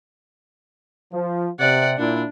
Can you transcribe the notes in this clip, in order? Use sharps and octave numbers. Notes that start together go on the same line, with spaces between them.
F3
C3 D5 F#5
A#2 D4 E4